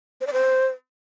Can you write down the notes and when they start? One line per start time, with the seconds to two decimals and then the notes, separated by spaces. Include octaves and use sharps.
0.21 C5
0.27 D5
0.33 C5